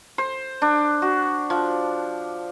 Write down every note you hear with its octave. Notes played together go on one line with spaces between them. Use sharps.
C5
D4
F#4
F3